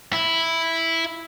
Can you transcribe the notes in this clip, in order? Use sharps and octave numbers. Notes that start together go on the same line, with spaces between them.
E4